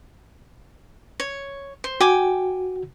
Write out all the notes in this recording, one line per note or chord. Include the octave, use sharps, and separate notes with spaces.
C#5
C5
F#4 G5 G#5 D6